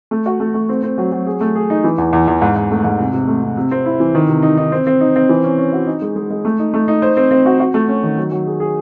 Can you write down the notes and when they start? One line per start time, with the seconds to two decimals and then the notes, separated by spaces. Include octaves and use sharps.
0.11 A3
0.26 F#4
0.40 A3
0.54 A3
0.69 C4
0.83 C4
0.98 F#3
1.12 F#3
1.26 G#4
1.41 A3
1.55 G#4
1.70 D#4
1.84 E3
1.98 E2
2.13 E2
2.28 E2
2.42 G#2
2.56 G#2
2.71 A3
2.84 G#2
2.99 C3
3.13 C3
3.28 A3
3.42 C3
3.57 C3
3.71 C4
3.86 E4
4.00 E3
4.15 D#3
4.29 C3
4.43 D#4
4.58 D#4
4.72 C4
4.87 C4
5.01 D#4
5.16 C4
5.29 E3
5.44 C#4
5.58 C#4
5.73 F#4
5.87 D#4
6.02 G#3
6.16 G#3
6.30 G#3
6.45 A3
6.59 D#4
6.74 A3
6.88 D#4
7.02 C5
7.17 C4
7.31 C4
7.46 F#4
7.60 F#4
7.74 A3
7.88 C#4
8.03 D#3
8.17 F#3
8.32 F#3
8.47 G#4
8.60 G#4